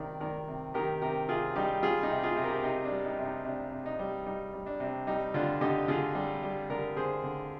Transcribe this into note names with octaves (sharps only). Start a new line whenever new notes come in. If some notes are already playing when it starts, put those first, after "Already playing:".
Already playing: C3 D#3 G3 A#4 D5
D#3 A#4 D5
C3
D#3 G4 A#4
C3 G4 A#4
C3 F4 G#4
G3 D#4 G4
G3 F4 G#4
D#4 G4
C3
F4 G#4
C3
G4 A#4
C3 D#4
D4
G3
D#4
C3
D#4
C3 D4
C3
D#4
G3
G3 D#4
G3
D4
C3 D4
G3 D#4
D3 D4 F4
D3 D#4 G4
D3 F4 G#4
G3
G3
D3 G4 A#4
D3 G#4 C5
D3